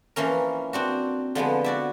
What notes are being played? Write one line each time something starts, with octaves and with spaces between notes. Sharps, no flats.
E3 F3 A#3 C#4 A#4
C4 D4 F#4
D3 F3 G#3 B3
F#4 D5 E5